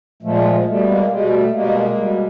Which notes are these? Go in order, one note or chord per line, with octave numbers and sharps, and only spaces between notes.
A#2 F3 G#3 A3
A3
G#3
B2 G3 A3
G#3 A#3
B2 G3 G#3
A3
B2 G3 G#3 A#3
B2 G3